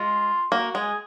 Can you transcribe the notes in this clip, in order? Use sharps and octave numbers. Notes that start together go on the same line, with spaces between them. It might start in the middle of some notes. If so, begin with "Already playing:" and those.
Already playing: G#3 F4
A#3 F#4
G#3 G#4